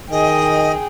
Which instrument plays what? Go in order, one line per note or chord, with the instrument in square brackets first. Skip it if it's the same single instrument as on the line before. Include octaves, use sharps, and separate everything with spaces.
[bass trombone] D#3 [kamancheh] G#4 G5 [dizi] D#5